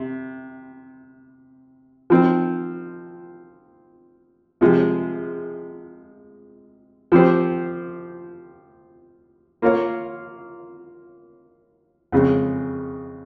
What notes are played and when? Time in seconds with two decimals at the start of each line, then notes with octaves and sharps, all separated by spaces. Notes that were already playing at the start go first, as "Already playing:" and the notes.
Already playing: C3
2.10 F3 C4 D#4
4.61 C3 F3 G#3
7.12 F3 C4 G4 C5
9.62 A#3 F4 A#4 C#5 F5
12.12 F2 C#3 G#3